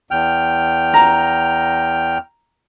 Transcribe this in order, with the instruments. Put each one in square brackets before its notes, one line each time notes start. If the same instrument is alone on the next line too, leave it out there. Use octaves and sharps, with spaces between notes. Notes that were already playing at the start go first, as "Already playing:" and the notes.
[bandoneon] E2 G5 F6
[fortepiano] A#5